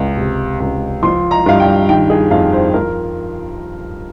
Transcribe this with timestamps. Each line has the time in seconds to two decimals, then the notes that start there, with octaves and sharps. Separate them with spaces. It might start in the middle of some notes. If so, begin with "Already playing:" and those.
Already playing: C#2
0.17 C3
0.60 C#2
1.03 F3 C6
1.31 A#5
1.46 G2 F5
1.60 G5
1.89 D#3 G5
2.10 G#4
2.31 F2 F5
2.53 C5
2.73 F3 A#4